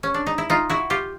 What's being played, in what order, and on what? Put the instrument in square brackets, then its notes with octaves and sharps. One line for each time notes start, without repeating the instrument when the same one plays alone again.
[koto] C#4
D4
D#4
E4
D#4 F4
E4 F#4
F4 G4